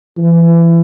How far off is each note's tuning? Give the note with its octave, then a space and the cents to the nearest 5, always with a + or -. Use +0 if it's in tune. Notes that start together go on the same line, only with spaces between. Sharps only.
E3 +30